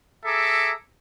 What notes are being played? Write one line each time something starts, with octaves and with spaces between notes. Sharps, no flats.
G#4 A4 E5 A#5 D6